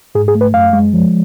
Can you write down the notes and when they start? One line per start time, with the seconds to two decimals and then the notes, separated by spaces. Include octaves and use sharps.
0.15 G#2 G#4
0.28 G#4
0.35 A3
0.41 B4
0.54 F#2 F5
0.73 G#3
0.93 F3